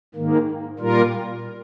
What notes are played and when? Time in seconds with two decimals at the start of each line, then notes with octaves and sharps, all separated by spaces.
0.15 G#2 D#3 A#3
0.79 A#2 G3 A#3 F4 A#4